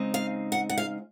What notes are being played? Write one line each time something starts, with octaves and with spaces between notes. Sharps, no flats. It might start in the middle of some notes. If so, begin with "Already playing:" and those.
Already playing: C#3 G#3 C4 D#4
F5
F#5
F#5
F5